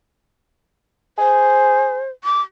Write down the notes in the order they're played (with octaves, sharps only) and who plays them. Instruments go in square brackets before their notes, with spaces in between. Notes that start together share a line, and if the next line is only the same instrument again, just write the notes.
[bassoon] G#4 [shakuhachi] C5
[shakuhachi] D6